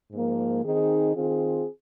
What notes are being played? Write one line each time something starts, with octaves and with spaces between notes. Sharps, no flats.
G#2 F3 A#3
D#3 C4 D#4 G#4
D#3 C4 F4 G#4